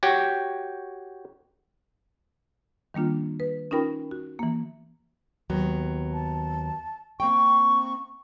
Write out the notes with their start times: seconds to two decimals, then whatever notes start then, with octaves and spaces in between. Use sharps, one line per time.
0.03 F#4 G4 C#5 G5
2.94 D#3 G3 A#3 D4 F4
3.40 B4
3.71 C#4 D#4 F4 A#4 G5 B5
4.11 F#4
4.39 E3 A#3
5.50 D#2 F#3 B3
6.13 A5
7.20 A#3 C4 G5 C#6